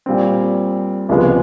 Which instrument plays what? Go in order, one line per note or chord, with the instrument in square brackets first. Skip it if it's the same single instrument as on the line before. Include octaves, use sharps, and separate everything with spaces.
[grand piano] A#2 G3 C4
C#2 C3 F3 G#3 B3